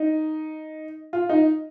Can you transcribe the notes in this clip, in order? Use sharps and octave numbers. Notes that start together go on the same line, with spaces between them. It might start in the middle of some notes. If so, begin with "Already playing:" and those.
Already playing: D#4
F4
D#4